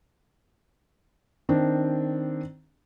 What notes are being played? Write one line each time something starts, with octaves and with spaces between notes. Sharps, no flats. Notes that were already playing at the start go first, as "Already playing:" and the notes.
D#3 C4 D4